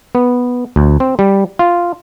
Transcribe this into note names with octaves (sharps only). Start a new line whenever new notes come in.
B3
D2
C4
G3
F4